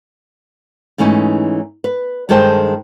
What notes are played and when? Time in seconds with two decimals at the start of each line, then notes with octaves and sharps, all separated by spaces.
0.98 G#2 E3 A3 C#4 D#4
1.84 B4
2.29 G2 D#3 G#3 A4 C5 G5